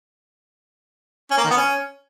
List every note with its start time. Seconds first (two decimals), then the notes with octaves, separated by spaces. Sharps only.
1.31 C#4
1.37 A#3
1.44 D#3
1.51 B3
1.57 C#4